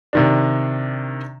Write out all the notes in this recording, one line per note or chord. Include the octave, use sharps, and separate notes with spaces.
C3 D#3 D4